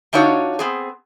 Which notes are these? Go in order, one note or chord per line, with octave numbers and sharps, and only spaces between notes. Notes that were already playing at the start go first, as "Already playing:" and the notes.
D3 D4 D#4 F4 F#4 C#5
B3 C4 G#4